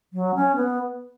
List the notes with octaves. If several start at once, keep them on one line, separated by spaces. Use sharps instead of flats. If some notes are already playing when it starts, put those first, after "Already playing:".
F#3
C#4
B3